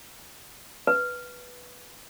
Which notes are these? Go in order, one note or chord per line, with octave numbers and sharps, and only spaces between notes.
B4